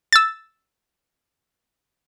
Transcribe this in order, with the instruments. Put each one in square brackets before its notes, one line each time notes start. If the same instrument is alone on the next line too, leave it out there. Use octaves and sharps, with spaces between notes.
[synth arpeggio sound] E6 A6